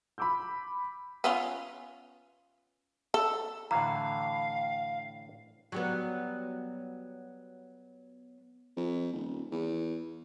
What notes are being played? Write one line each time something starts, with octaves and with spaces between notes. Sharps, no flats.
B5 C6 D6 E6 G6
B3 C#4 F4
A4
A2 D3 E3 F5 A#5
F#3 G3 B3
F2
D#1
E2